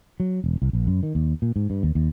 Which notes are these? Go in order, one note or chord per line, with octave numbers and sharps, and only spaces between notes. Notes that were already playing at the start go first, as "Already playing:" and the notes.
F#3
E1
C2
A#1
F#2
D#3
D#2
A#2
G#2
G2
D#2
D#2